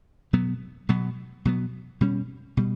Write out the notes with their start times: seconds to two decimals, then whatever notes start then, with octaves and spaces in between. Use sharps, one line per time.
0.33 B2 F#3 B3
0.89 B2 F#3 B3
1.45 B2 F#3 B3
2.01 B2 G3 C#4
2.57 B2 G3